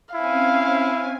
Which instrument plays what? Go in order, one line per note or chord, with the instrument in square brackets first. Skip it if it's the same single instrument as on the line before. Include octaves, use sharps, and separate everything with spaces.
[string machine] C4 C#4 G#5 [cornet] E4 [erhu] F5